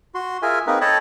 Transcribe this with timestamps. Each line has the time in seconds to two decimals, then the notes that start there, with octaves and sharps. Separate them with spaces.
0.15 F#4 C6
0.42 F4 G#4 A#4 E5 G#5
0.67 A#3 C4 D#4 G#4 A#4 B4
0.81 A4 C#5 D#5 G5 A5 B5